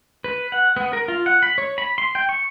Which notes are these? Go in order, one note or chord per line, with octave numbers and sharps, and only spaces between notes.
B4
F#5
B3
A#4
F4
F#5
B5
C#5
B5
C6
G5
C#6